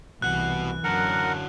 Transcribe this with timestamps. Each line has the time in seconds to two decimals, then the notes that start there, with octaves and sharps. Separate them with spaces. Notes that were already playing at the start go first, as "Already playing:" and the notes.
0.22 C2 B2 E3 F#5 F#6
0.84 F#2 D3 F#3 A#4 F#5